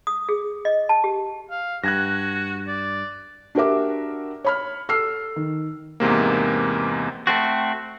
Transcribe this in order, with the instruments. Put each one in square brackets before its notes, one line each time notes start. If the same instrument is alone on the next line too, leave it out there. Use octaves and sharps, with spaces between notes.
[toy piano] D#6
G#4
D#5
A5
G4
[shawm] F5
[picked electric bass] G2 [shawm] F#4 [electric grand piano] F#6 G#6 A#6
[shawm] D5
[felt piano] D4 F#4 G4 A#4 E5 D6
C#5 B5 F6
A4 E6 F6 C7
D#3
[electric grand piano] E2 G#2 C3 A#3
[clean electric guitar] A3 C4 F#4